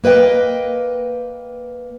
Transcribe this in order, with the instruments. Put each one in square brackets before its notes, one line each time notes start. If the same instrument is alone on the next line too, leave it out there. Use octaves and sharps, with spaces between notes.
[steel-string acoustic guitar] A#3 B4 D#5 G5